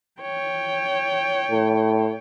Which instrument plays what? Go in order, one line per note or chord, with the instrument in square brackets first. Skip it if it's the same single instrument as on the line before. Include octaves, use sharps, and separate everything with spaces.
[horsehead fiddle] C#5 G5
[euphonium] A2